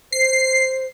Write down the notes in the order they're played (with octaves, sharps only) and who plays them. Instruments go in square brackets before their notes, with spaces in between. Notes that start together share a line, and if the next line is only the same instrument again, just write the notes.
[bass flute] C5 [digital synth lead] C7